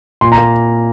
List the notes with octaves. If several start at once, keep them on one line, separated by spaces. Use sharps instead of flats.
A#2 C6
A#5
A#3